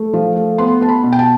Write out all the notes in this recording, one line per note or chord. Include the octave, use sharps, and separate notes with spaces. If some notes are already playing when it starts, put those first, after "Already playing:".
Already playing: A3
F3
A3
B3 C6
B3 A5
B5
B2
G5
A5